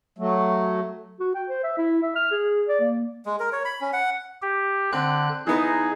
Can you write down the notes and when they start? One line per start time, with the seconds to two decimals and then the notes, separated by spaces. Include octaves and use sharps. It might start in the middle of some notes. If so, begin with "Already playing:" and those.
0.18 F#3 A3
1.20 F#4
1.35 G5
1.49 C5
1.63 E5
1.78 E4
2.03 E5
2.16 F6
2.31 G#4
2.68 D5
2.81 A#3
3.25 G#3
3.40 A#4
3.52 C#5
3.65 B5
3.81 C#4
3.93 F#5
4.42 G4
4.93 D3 C4 F#6
5.47 E3 B3 D#4 G#4